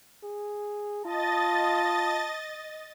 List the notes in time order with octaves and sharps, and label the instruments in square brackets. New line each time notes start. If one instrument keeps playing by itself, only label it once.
[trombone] G#4
[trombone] F4 [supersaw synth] D#5 A6 [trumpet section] A5